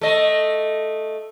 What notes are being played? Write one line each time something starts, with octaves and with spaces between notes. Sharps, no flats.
A3 D#5